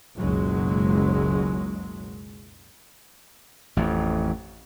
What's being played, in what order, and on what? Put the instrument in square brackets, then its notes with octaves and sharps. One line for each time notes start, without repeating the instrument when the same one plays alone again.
[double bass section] F#1 C#2 B2 F#3 G#3
[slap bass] A1 F2